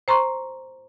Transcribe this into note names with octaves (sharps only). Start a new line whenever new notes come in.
C5 A#5 C6 C#6